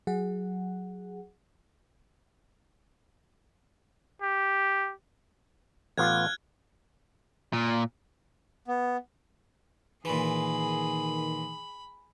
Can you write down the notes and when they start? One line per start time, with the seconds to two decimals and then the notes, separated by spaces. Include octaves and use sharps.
0.07 F#3 G#4 F#5
4.22 G4
5.97 A1 B3 F4 F6 F#6 G#6
7.53 A#2
8.68 B3
10.05 A#2 D#3 E3 G#4 B5